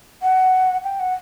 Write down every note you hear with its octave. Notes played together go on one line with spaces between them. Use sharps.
F#5
G5
F#5